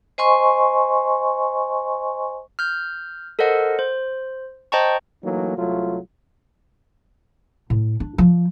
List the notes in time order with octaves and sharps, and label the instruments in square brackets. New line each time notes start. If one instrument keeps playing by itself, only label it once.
[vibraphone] C5 D#5 G#5 C6 C#6
[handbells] F6 G6
A4 A#4 C5 D#5 F#5
C5
C5 D#5 G5 A5 A#5 C#6
[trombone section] E3 F#3 A3 A#3 D#4
C2 F#3 A3 F4
[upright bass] A2
D4
F3